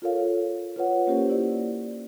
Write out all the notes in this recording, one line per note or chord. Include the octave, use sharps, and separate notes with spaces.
F4 A4 A#4 C#5 F5
F4 B4 C#5 F#5
A#3 C#4 G4 A#4 C5
E4 D5